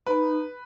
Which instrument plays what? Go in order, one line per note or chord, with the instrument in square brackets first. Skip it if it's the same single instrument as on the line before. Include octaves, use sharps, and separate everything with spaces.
[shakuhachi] D#4 [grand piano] B4